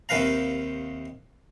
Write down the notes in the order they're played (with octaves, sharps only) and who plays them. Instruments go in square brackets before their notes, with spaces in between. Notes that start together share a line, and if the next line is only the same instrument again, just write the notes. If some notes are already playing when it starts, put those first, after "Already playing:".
[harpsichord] D#2 C3 D#3 B4 F5 A#5